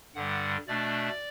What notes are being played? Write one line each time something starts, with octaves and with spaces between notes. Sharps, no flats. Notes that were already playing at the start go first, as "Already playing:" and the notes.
G2 D3 G3 F#5
B2 A3 D4 D5